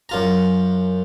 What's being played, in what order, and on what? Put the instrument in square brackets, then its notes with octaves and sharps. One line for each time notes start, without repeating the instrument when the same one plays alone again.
[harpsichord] F#2 F4 A#5